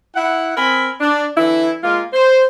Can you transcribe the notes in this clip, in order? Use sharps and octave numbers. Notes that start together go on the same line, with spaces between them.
E4 F#5
C4 A#4 G#5 B5
D4
D3 E3 E4
G#3 A#3 F4
C5